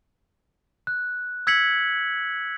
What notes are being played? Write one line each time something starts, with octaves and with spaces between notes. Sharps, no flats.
F#6
E6 G#6 B6 C#7 F#7